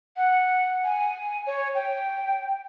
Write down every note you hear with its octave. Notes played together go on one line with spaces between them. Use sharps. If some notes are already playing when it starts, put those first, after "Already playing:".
F#5
G#5
C#5
G5